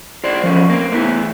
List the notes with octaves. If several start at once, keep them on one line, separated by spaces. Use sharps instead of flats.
F4 C5 D5
F3 C#4
A#3 C4
A3 B3 C#4 E4